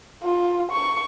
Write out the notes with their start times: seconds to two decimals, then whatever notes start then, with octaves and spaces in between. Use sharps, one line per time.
0.24 F4
0.72 C#6